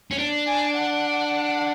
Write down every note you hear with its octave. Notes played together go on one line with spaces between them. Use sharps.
C#4
D4
G#5
F#5